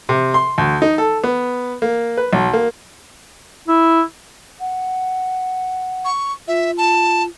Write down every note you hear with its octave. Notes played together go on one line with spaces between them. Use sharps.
C3
C6
D2
D#4
A4
B3
A#3
B4
B1
A#3
E4
F#5
C#6
F4 E5
A5